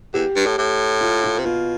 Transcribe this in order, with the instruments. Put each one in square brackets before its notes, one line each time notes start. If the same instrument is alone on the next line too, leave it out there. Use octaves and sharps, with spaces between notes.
[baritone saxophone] E2 [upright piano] G4
[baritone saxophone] G2
A2
A2
[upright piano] F4
F4
[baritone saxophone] C3
[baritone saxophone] B2 [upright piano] F4